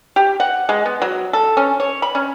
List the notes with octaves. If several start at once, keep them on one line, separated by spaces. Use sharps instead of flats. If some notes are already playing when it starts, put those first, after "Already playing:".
G4
F#5
G#3
B3
F#3
A4
C#4
C#5
B5
C#4